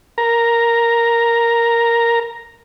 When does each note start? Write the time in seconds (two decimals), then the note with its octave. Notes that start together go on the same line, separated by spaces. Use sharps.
0.18 A#4 A#5